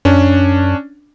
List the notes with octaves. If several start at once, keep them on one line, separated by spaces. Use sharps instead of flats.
F#2 C#4 D4